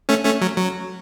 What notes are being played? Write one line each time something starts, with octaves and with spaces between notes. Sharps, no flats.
A3 C#4
A3 C#4
F#3
F#3